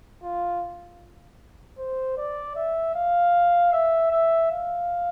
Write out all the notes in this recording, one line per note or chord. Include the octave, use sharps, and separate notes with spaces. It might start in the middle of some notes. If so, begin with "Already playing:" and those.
F4
C5
D5
E5
F5
E5
E5
F5